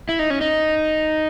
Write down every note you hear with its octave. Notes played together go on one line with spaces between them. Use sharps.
E4
D#4
C#4
D#4